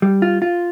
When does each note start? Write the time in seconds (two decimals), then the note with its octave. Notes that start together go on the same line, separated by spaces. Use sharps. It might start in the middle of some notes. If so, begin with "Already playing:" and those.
0.02 G3
0.22 F4
0.42 F4